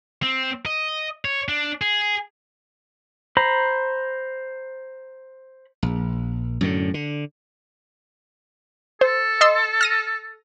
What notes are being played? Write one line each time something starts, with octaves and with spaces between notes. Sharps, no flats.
C4
D#5
C#5
D4
G#4
C5 A#5 B5
A#1
F#2 A2 D3
D3
A4 C5
D#5 C6 E6
F6 A#6 D#7